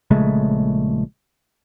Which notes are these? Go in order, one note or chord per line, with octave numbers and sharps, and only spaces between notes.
A#1 C#3 G#3 A3